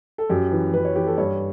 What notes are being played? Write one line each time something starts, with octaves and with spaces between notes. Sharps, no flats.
A4
F#2 G4
E3
F#2 B4
C#5
E3 G4
A4
G2 C#5